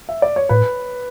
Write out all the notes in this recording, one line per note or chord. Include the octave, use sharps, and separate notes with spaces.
E5
D5
C#5
A2 B4